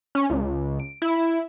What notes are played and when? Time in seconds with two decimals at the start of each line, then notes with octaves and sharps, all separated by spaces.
0.15 C#4
0.30 C#2
0.80 D7
1.02 E4